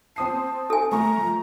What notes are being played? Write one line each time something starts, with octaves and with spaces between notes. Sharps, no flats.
C4 A5 D#6 C7
A4 G#5
A3 A#5 C#6
F3